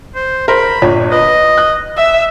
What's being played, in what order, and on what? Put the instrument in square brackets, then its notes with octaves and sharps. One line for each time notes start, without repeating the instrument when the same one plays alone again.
[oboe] C5
[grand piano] A#4 C5 [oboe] B5
[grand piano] G1 A#2 C#5
[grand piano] B4 [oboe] D#5
[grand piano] F#6
[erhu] E5 [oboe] E6